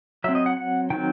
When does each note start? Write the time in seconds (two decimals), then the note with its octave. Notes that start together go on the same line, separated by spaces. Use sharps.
0.24 F#3 E5
0.29 C4
0.35 D#5
0.46 F#5
0.57 F#5
0.90 D#3 F#3 C4 G5